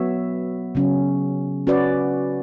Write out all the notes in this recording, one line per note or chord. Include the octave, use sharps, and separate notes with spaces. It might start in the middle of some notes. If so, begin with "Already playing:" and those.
Already playing: F#3 B3 F#4 C#5 E5
C#3 F#3 C#4
C#4 F#4 B4 D5